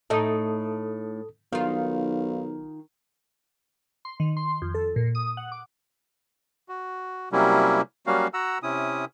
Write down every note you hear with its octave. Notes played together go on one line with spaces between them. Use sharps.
A2 A3 D#4 A4 D#6
B1 D#3 F4 F5
C6
D#3
C6
F2
A4
A#2
D#6
F#5
D6
F#4
C3 F#3 G3 A#3 C#4 E4
F#3 G3 A#3 C#4 F#4 F5
F#4 F#5 A#5 E6
C3 C#4 E4 D#6